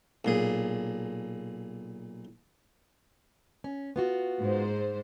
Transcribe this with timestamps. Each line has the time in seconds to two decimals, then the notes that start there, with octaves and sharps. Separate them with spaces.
0.25 B1 A#2 G#4
3.64 C#4
3.96 B3 F4 F#4
4.43 G#2 C5